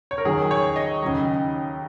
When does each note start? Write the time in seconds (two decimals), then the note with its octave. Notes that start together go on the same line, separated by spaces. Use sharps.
0.11 C#5
0.18 A#4
0.25 D#2 D#3 F#3 G#4
0.51 C#5
0.76 D#5
1.02 D#2 C#3 F#3